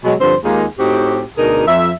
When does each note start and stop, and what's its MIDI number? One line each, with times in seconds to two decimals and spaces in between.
0.04 0.14 47
0.04 0.14 54
0.04 0.14 56
0.20 0.35 43
0.20 0.35 50
0.20 0.35 53
0.20 0.35 60
0.20 0.35 72
0.43 0.65 39
0.43 0.65 56
0.43 0.65 58
0.43 0.65 63
0.43 0.65 65
0.43 0.65 68
0.78 1.23 45
0.78 1.23 60
0.78 1.23 63
0.78 1.23 66
0.78 1.23 67
1.37 1.65 38
1.37 1.65 47
1.37 1.65 62
1.37 1.65 63
1.37 1.65 68
1.37 1.65 70
1.66 1.91 41
1.66 1.91 76